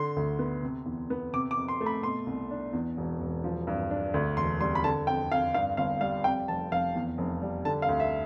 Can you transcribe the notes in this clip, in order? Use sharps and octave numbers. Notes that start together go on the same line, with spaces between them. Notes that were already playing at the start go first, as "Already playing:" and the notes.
Already playing: D3 C6
D2
B3
C3
E2
B3
C3 D6
D6
F2
C6
A3
B5
B2 C6
C2
D4
E2
E1
E1
F3
G2
D4
D2
E1 C6
G3 C6
B5
D3 A5
F2 G5
F2 F5
G2 F5
G1 F5
G3 F5
F2 G5
F1 A5
F1 F5
E2
F1
G3
D3 A5
F5
D2
E5